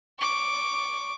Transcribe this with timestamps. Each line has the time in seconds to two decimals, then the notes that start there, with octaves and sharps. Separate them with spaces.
0.18 C#6 D6